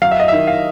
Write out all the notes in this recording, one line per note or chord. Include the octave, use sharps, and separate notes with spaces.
F#3 F5
E5
D#5
D#3 E5
F5